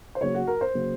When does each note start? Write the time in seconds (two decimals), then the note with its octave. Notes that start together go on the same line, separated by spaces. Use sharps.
0.15 C5
0.21 C#3 F#3 A#3 C#5
0.35 F#4
0.48 A#4
0.61 C5
0.74 C#3 F#3 A#3